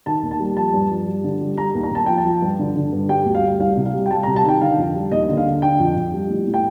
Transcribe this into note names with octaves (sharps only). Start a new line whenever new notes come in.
D#3 A5
D#2
A5
G3
F3 A5
G2
F3
G3
D3
G3
G3 A#5
D#2
A#5
D#2 A5
F3 G5
A5
F3
G2
D3
D3
G2
G3 G5
D2
F5
G3
C2 F5
C3
F5
G3
G5
G3 A5
A#5
C3
A5
D#3 G5
D3 F5
F2
G3
D#2 D#5
D3
F5
D3
D3 G5
F2
F2
G3
A2
A2
G5